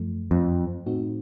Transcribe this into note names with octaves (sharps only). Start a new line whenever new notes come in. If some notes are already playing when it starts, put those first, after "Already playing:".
Already playing: F#2 F3 A3
F2
A2 A3 C4 D#4 F#4